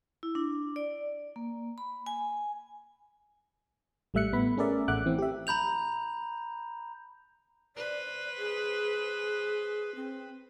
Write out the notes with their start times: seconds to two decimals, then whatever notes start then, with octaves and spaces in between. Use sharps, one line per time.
0.23 E4
0.35 D4
0.76 D5
1.36 A#3
1.78 B5
2.06 G#5
4.14 A1 G3 A3 E5 F#6 C#7
4.33 A2 B3 B5
4.57 A3 C#4 G#4 A#4 D5 E5
4.88 A1 A3 E5 F#5 D6 F#6
5.06 E3 C4
5.18 G4 E5
5.47 A#5 B5 G6 F7
7.76 B4 C5 D5
8.38 G#4
9.95 C4